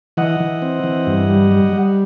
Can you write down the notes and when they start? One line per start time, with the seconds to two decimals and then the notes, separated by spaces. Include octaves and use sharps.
0.17 E3 D#5 F#5
0.40 E3
0.62 C4
0.84 E3
1.07 G2
1.29 G3
1.51 G3
1.73 G3